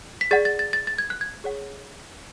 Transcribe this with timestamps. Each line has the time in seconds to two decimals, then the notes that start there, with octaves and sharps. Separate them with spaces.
0.21 B6
0.31 G#4 D5 F#5 A6
0.45 A6
0.59 A6
0.73 A6
0.87 A6
0.98 G#6
1.10 F#6
1.21 G#6
1.44 G#4 C#5 F#5